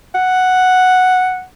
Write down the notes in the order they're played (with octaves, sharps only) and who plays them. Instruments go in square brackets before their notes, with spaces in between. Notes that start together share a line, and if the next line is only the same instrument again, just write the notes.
[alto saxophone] F#5